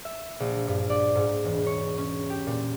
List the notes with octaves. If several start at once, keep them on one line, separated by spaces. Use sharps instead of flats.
E5
A#1
G2
D5
G#2
E1
C#5
C#4
G4
A#2